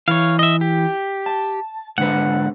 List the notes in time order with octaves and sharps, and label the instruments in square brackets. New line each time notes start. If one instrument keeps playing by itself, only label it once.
[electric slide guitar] E3 [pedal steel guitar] C#5 F5
[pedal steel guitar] D#5 E5
G4
[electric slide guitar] A5
[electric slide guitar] G#2 D3 B4 [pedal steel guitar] F#5